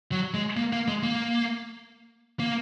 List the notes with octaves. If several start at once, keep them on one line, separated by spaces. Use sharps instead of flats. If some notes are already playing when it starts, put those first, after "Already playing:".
F#3
G#3
A#3
A#3
G#3
A#3
A#3